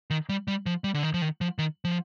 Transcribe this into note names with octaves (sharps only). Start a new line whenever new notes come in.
D#3
G3
G3
F3
G3
D3
D#3
F3
D#3
F3
D#3
F3